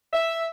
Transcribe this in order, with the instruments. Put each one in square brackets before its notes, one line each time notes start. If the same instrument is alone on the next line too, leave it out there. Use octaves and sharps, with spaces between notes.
[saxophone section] E5